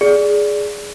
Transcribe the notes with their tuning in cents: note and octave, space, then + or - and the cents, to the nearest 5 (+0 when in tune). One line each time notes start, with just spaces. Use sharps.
G#4 +0 D5 -10